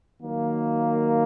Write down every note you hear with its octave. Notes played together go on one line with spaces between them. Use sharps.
D#3 F#3 A#3